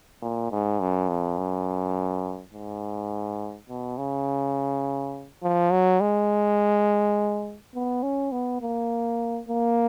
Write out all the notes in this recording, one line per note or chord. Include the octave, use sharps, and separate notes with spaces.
A#2
G#2
F#2
F2
F#2
G#2
B2
C#3
F3
F#3
G#3
B3
C#4
B3
A#3
A#3